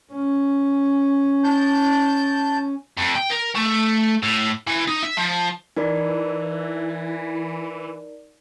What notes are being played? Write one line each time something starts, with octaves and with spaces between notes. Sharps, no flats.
C#4
A5 G6
F2
G5
A#4
A3
A2
E3
D#4
E5
F3
E3 D#4 A#4 D5